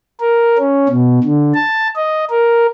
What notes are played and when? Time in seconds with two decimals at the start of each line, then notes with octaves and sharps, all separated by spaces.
0.20 A#4
0.58 C#4
0.89 B2
1.24 D3
1.54 A5
1.96 D#5
2.30 A#4